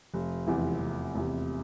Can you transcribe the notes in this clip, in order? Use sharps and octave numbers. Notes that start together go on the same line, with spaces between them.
F1
E2 C3 E3
F1
E2 C3 E3